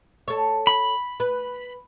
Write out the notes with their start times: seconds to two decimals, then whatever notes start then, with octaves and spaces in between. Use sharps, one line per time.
0.28 A4 C#5
0.67 B5
1.20 B4